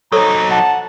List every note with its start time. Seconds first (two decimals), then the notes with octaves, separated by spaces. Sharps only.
0.12 F#3 D#4 A4 C5 C#5 A#5
0.51 F#5 A5